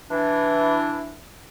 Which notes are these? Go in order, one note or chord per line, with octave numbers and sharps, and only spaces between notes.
E3 D4